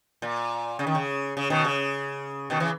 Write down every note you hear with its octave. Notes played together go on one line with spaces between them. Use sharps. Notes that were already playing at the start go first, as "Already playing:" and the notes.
A#2
C#3
D#3
C#3
C#3
B2 D#3
C#3
B2 D#3
C#3 E3